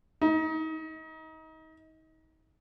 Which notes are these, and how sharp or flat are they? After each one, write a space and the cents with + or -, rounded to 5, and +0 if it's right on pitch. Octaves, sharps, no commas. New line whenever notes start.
D#4 +30